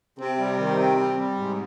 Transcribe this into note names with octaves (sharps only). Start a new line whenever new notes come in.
C3 C4
G3
D#3
C4
G3
G3
G#2 C3